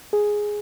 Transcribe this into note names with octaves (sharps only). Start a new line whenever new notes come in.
G#4